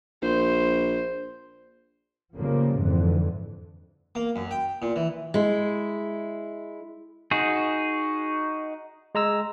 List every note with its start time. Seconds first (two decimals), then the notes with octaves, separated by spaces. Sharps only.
0.22 A#1 C5
2.35 C#3 F3 G3 A#3
2.79 F2 G#2 D3 E3
4.15 A#3
4.36 F#2
4.51 G5
4.82 A#2
4.96 E3
5.34 G#3 E4
7.31 D#4 F#4 G#4
9.15 G#3 A#5 E6